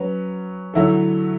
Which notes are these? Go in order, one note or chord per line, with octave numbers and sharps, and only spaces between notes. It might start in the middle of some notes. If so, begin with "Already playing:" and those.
Already playing: F#3 C#4 B4
D3 F#3 A3 E4 A4